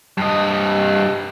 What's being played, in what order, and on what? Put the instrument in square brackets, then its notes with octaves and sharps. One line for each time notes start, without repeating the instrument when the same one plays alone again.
[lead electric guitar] G2 D#5